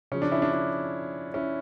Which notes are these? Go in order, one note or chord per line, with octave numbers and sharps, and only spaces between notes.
C#3 F3 C#4
D4
C#4 E4
D4
D4
C#4 E4